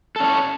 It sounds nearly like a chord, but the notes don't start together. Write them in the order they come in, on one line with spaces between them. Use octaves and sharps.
A4 C#4 C#5